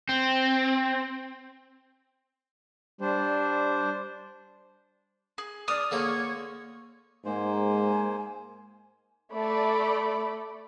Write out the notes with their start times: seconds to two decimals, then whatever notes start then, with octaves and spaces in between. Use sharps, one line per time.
0.09 C4
3.01 G3 D4 C5
5.38 G#4
5.68 D4 D5 D#6 F6
5.91 D3 A#3 G#4 C#5
7.25 G#2 G#3 A#3 C5 G#5
9.33 A3 D5 B5